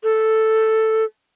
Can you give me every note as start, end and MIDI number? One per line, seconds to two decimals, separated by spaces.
0.03 1.04 69